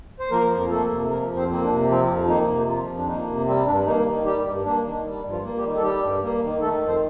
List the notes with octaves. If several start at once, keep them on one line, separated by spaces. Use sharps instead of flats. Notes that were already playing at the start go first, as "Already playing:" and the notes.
C5
F3 A#3 A#4
F2
A3 A#3 A4
C3
F3 A#3 A#4
F2
C4 C5
A#3 C4
D4
C3
F3 C4
F2
D#3 A#3 D#4
C3
F3 F4
F2
D4
D#3 A#3 D#4
C3
G3 C4
G2 D4
D#3 A#3 D#4
D#3
G3 G4
G2
A#3 D4
D#3
G3
G2
F3 F4
A#3
G3 G4
D#3
A4
G3 G4
G2
A#3
D#3
D#3 A3 A4
F2
C4 C5